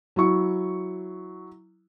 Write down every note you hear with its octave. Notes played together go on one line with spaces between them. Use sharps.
F#3 E4 C#6